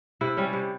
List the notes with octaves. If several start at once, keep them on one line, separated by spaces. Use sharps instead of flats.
C3 E4
G3 C#4
C3